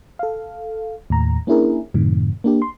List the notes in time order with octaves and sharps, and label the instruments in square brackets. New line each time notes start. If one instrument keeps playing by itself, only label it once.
[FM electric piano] A4 F5
D#2 A2 A#5
A#3 C#4 D4 E4 G#4 A#4
F#2 A2 C3 D#3
A#3 D4 G4
C6